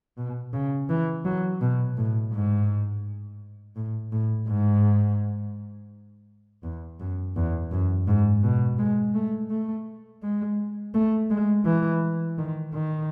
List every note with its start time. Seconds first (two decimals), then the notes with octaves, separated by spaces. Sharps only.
0.17 B2
0.54 C#3
0.90 E3
1.25 F#3
1.61 B2
1.98 A2
2.33 G#2
3.76 A2
4.12 A2
4.48 G#2
6.63 E2
7.00 F#2
7.36 E2
7.71 F#2
8.07 G#2
8.43 B2
8.79 G#3
9.15 A3
9.50 A3
10.23 G#3
10.94 A3
11.30 G#3
11.66 E3
12.38 D#3
12.73 D#3